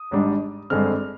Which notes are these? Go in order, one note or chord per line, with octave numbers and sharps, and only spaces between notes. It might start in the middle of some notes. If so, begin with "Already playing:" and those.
Already playing: D#6
G#1 G#2 G3 D4
G#1 G2 D3 G#3 C4 F6